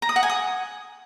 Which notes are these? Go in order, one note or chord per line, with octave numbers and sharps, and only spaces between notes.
A#5
D#6
F#5
G#5
D#6